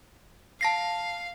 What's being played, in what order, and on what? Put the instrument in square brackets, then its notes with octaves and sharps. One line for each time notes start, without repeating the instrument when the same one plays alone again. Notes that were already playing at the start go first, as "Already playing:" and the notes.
[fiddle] F5 [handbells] A5 A#6 C7